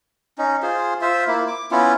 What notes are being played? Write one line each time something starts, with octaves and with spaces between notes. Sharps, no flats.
C#4 D#4
F4 G#4 C5
F4 C5 E5
A#3 E4
D6
B3 C#4 E4 F4